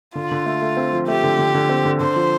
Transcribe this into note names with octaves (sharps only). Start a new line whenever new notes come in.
D3 F4
D3
A3
A3
C4
F3
A3 G4
D3
D3
D3
C4
D3
D3 C5
F3